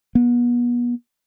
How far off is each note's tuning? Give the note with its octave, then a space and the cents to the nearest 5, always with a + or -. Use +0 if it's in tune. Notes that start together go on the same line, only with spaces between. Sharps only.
B3 -35